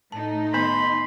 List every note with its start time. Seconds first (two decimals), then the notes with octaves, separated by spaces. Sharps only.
0.12 A2 A3 D#4 A5
0.54 D#3 B3 G#5 B5 C6